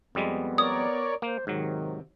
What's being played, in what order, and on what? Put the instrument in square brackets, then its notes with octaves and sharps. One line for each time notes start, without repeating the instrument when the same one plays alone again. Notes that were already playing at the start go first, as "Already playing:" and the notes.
[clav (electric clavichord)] F2 G3 G#3 [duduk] B3
[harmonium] A#4 C#5 D5 [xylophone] D#6
[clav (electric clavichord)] A#3 [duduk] C5
[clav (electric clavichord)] G#2 F#3 [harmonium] C3 [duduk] D#3